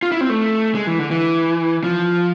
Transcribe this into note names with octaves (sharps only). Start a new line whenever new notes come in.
F4
E4
C4
A3
G#3
E3
D3
E3
F3